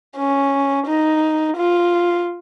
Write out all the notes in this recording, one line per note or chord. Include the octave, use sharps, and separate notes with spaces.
C#4
D#4
F4